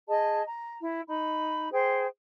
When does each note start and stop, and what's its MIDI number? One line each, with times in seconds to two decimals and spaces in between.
0.08 0.42 68
0.08 0.42 75
0.08 0.42 81
0.47 0.77 82
0.81 1.02 64
1.07 1.69 63
1.07 1.69 83
1.72 2.07 68
1.72 2.07 72
1.72 2.07 79